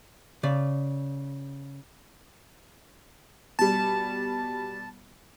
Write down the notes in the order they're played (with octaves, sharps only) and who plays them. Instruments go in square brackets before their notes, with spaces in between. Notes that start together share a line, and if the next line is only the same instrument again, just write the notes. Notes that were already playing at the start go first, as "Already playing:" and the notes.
[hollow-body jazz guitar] C#3 D5
[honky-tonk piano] B2 G3 [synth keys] A5